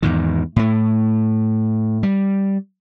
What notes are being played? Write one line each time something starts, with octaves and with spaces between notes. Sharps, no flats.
E2 G#2 D#3
A2 A3
G3